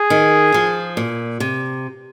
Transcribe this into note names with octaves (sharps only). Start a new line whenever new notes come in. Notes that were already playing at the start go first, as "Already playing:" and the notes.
Already playing: G#4
D#3
F3
A#2
C3